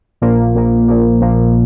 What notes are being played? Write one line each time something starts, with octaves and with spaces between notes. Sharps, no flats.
A#1 A#2 F3 A#3
A#1 A#2 F3 A#3
A#1 A#2 F3 A#3
A#1 A#2 F3 A#3